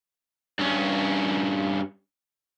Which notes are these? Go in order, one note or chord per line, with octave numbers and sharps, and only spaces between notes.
G2 C#4